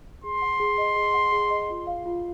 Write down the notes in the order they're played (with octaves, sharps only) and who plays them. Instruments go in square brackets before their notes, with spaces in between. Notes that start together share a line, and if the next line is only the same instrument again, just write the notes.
[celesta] G#4 [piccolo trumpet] C6
[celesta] F#5
G#4
D#5
G#4
F#5
G#4
D#5
F4
F5
F4